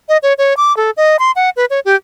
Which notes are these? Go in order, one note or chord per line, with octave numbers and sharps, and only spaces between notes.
D#5
C#5
C#5
D6
A4
D#5
C6
F#5
B4
C#5
G4